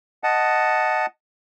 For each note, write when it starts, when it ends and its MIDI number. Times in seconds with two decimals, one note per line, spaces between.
0.24 1.06 75
0.24 1.06 78
0.24 1.06 81